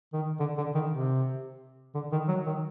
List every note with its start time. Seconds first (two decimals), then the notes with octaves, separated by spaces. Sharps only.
0.13 D#3
0.40 D3
0.58 D3
0.75 D#3
0.91 C3
1.95 D3
2.12 D#3
2.28 F#3
2.46 D#3